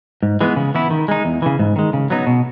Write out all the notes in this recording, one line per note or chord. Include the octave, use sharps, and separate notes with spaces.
G#2
E3 G#3 B3
C#3
E3 B3 E4
D#3
G#3 D#4
E2
C#3 E3
G#2
D#3 G#3
C#3
F#3 B3 D#4
B2